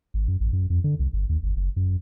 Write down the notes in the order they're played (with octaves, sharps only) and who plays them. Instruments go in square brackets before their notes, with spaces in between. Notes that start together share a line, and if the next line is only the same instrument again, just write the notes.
[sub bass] G#1
F#2
A1
F#2
F2
D3
C2
G1
D#2
G1
F#1
F#2